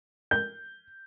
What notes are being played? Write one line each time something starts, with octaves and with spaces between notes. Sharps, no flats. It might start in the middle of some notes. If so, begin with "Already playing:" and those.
G6